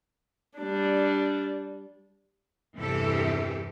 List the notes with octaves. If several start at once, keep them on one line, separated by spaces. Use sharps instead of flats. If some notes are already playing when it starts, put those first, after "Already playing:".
G3 D4
E2 G2 C3 E3 G4 A4